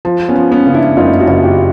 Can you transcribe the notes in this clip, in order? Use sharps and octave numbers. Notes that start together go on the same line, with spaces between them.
F3
B3 C#4
F3
B3 C#4
C#3
D4 E4
F#1 D#4 F4
E4 F#4
F#1
F4 G4